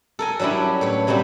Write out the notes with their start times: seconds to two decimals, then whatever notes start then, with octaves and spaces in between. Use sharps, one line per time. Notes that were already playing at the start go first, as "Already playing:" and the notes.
0.19 A4 A#4 G#5
0.39 F#3 G3 C#4 D4 E4
0.81 A2 B4 C#5
1.07 C3 F#3 G3 A#3 F#4